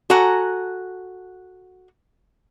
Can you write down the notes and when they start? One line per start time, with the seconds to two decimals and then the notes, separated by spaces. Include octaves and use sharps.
0.10 F#4 A4 F#5 G#5 A#5